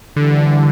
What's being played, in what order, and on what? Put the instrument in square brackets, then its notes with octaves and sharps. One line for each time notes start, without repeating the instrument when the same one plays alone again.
[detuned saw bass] D3 [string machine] E3 G3